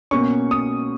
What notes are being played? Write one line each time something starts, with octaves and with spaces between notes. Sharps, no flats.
B2 A#3 C#4 C#6
D#6